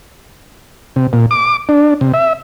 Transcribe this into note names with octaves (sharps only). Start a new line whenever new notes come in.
C3
A#2
D6
D4
C3
E5